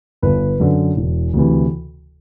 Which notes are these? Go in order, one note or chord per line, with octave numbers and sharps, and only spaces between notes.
G1 B4
F#2 D3
E1
D2 C3 E3